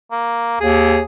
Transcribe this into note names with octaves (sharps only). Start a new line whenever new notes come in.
A#3
D#2 G#4